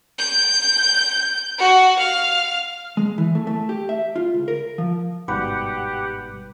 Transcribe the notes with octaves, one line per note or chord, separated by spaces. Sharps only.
G6
F#4
F5
G#3
E3
A3
A3
G4
E5
F4
C#2
A#4
F3
G1 G#2 B2 G3 G4 B4 F#5